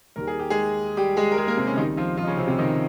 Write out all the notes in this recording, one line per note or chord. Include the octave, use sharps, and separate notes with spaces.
D#2 D#3 G3 A#4
G#4
G4
G#3 G#4
G3 G4
G#3 G#4
A#4
G#3 G#4
A#3 A#4
C3 C4
C#3 C#4
C2 C3 D#3 G3 D#4
F3 F4
F3 F4
D#4
C#3 C#4
C3 C4
C3 C4
D#3 D#4